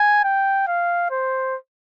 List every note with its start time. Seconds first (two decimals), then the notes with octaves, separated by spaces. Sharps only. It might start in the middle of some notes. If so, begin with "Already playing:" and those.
Already playing: G#5
0.24 G5
0.67 F5
1.11 C5